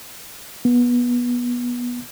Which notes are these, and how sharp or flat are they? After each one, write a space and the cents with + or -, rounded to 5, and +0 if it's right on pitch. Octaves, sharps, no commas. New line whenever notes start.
B3 -20